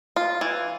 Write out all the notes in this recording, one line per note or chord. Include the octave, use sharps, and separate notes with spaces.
F4
E3